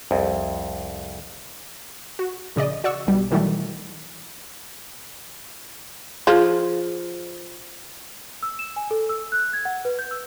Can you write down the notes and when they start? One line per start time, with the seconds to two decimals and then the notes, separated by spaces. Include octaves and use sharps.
0.11 C2 F2
2.19 F#4
2.56 A#1 C#3 D5 D#5
2.84 F#4 D5 F#5 C#6 E6
3.07 B1 B2 G3
3.31 B2 D#3 E3 F#3 G3 A3
6.27 F3 F4 G#4
8.43 E6
8.59 E7
8.76 G#5
8.91 A4
9.09 E6
9.32 F#6
9.53 G#6
9.65 F#5
9.85 B4
9.99 G6
10.11 E6